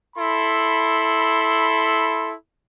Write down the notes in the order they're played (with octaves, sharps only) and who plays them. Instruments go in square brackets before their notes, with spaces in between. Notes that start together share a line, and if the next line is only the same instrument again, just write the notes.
[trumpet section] E4 A4 B5 C6